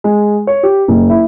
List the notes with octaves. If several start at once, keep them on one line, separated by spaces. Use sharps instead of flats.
G#3
C#5
G4
F#1
E4